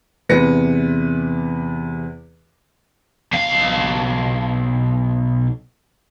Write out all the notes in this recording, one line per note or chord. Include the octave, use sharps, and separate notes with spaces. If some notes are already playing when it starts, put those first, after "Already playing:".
E2 C3 B4 A#6 C#7
B1 F5